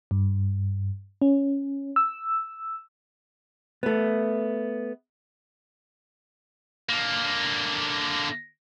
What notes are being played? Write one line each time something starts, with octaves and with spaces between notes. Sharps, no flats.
G2
C#4
E6
A3 B3
D3 A#3